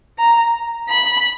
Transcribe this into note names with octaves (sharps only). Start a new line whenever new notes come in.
A#5
B5